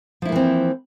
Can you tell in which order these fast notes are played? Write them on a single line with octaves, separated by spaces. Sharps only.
F3 E4 A#3 E3 C4